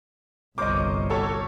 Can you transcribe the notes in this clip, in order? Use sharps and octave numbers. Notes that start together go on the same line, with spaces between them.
G1 C2 A#4 C5 C#5 D#5 D6
F#4 G4 A4 C#5